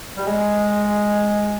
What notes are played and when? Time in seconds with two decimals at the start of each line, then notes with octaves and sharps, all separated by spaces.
0.17 G3
0.25 G#3